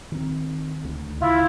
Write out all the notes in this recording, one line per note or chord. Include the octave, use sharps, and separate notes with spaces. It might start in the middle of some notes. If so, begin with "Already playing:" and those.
D#3 C4
D2
C#3 E4 F4